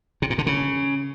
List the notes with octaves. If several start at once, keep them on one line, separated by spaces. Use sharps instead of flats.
C3
A#2
D3
C#3